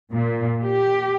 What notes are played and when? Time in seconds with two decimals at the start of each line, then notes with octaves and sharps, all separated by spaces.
0.13 A#2
0.64 G4